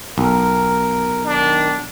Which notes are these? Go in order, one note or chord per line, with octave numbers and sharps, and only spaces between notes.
B1 A#4
D#3 D4